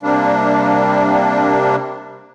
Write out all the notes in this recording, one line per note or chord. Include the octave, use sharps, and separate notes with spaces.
C3 G3 A#3 D4